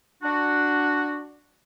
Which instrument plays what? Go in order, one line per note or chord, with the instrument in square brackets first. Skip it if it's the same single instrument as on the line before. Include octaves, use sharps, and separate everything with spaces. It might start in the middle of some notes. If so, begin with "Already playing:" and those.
[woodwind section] D4 F#4